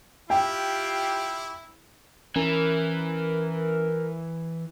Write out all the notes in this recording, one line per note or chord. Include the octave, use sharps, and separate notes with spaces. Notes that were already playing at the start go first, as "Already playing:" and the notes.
E4 F4 G4 G5
E3 C#4 A#4